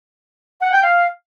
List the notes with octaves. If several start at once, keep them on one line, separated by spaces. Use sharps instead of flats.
F#5
G5
F5